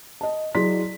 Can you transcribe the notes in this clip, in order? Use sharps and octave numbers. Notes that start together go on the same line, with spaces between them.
D#5 A5
F#3 E4 G#4 D5 C6 B6